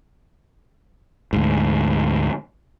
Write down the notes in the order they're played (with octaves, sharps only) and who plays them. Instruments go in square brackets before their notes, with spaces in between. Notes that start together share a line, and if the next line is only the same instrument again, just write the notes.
[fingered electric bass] D2 G#2